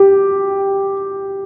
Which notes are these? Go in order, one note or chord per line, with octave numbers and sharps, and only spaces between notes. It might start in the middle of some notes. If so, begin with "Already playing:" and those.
Already playing: G4